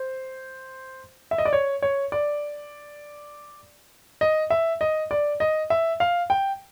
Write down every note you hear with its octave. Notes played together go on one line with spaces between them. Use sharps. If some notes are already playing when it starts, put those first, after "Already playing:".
Already playing: C5
E5
D#5
D5
C#5
C#5
D5
D#5
E5
D#5
D5
D#5
E5
F5
G5